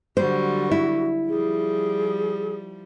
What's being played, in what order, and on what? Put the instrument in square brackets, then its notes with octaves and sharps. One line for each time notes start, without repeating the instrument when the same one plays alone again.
[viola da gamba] D3 F#3 G3 [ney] F#4 [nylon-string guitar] C5
[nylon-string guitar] E4
[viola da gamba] F3 G3 [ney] G#4